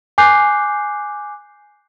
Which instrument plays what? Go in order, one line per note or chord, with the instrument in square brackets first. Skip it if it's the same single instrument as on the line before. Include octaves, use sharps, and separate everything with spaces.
[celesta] G#5 D6 F#6 G6 C7